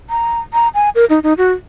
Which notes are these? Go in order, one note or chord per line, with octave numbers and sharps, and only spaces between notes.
A#5
A#5
G#5
A#4
D#4
D#4
F#4